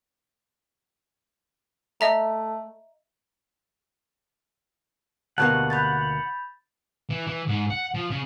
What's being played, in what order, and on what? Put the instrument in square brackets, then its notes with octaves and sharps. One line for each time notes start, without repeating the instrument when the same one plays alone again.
[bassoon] A3 [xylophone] D#5 E5 A#5
[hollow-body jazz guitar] D2 B2 A#3 [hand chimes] G4 A5 [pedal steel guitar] F#5
[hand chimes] B5 G6 A6
[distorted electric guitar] E3
E3
G#2
F#5
F3
C#3